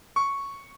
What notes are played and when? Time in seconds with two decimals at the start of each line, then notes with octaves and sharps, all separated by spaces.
0.16 C#6